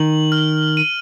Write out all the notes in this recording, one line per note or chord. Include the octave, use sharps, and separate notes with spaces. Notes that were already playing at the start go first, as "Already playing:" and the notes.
Already playing: D#3 F#7
F6
D#7